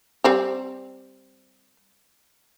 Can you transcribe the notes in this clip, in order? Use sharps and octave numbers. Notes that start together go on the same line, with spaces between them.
G3 C4 G4